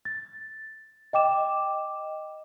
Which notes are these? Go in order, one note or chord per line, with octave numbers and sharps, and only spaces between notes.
A6
D#5 G5 D6 E7